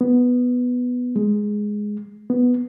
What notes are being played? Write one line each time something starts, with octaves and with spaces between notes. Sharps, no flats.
B3
G#3
B3